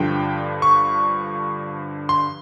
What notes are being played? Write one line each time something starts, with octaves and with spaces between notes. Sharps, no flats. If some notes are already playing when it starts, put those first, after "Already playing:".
Already playing: G2 D3 F3 G5
C#6
C6